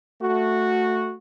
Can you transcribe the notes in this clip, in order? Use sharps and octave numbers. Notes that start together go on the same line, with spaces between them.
A3 F#4